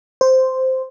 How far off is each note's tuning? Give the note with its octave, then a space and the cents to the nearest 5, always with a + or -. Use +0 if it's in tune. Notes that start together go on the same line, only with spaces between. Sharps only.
C5 -5